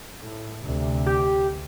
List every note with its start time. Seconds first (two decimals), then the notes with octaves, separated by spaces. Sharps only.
0.20 A2
0.65 D2 C3
1.06 G4